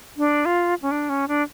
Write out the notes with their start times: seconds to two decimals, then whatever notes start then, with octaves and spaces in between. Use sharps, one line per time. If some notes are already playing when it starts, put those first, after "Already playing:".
0.17 D4
0.45 F4
0.82 C#4
0.91 D4
1.09 C#4
1.28 D4